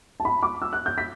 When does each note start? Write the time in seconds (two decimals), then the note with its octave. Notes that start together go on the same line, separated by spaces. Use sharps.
0.20 A5
0.25 B5
0.43 D6
0.62 E6
0.73 F#6
0.86 G6
0.98 B6